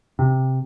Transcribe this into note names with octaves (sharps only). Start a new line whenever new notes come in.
C3